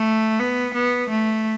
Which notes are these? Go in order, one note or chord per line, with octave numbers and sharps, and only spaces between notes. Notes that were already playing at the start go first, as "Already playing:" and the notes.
Already playing: A3
B3
B3
A3